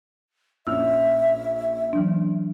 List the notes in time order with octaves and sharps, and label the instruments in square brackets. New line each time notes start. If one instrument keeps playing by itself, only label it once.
[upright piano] A#1 C#4 F6 [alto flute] E5 [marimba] E6
[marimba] E3 F#3 D4